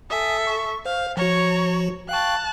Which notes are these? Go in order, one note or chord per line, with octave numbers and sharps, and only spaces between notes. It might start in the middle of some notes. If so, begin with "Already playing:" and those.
A4 E5 G#5 D#6
C#6
C5 F5
F3 F#4 C#5 A#5
F5 G5 A5 C#6 F#6